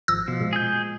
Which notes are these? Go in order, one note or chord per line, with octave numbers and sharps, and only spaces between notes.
G#1 F3 E6 A#6
B2 F3
A#2 G#3
G#4 G6